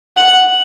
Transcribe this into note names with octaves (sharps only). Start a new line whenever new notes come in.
F#5 F#7